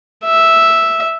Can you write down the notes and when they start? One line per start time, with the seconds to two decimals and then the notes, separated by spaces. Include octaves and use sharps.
0.25 E5